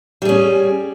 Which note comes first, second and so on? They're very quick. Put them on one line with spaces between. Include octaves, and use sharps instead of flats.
G3 G#4 C#4